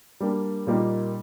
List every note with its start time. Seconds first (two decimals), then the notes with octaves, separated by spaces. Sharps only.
0.20 G3 A#3 D4
0.67 A#2 G3 A#3 D#4 A#4